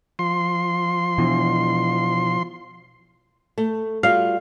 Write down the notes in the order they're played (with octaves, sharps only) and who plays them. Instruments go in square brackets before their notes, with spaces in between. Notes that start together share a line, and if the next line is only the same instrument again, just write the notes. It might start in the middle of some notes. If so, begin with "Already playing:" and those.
[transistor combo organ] F3 C6
[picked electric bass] B2 E3
[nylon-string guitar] A3
[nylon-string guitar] G3 F4 F#4 [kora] F5